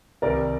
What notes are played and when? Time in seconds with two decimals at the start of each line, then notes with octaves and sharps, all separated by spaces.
0.22 C2 C3 D#3 G3 A#4 D5